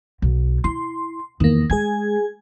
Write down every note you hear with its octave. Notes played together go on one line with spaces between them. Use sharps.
B1
E4 C6
E2 D#3 A#3
G#3 G#4 G#5 G#6